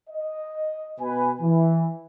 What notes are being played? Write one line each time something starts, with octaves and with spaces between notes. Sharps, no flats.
D#5
B2 B4 G#5
E3